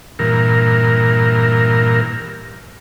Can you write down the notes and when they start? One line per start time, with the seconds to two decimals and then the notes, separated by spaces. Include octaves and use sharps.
0.19 G2 A#2 E3 A#4